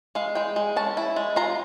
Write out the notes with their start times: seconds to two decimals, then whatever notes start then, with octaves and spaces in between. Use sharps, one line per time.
0.15 G#3 F5
0.35 G#3 G5
0.56 G#3
0.76 C#4 A5
0.97 E4
1.16 G#3
1.36 F4 A#5